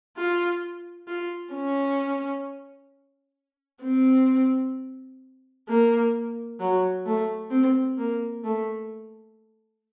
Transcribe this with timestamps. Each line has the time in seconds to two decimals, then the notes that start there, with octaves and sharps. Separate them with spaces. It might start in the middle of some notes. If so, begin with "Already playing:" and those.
0.17 F4
1.08 F4
1.54 C#4
3.84 C4
5.68 A#3
6.60 F#3
7.06 A3
7.51 C4
7.97 A#3
8.44 A3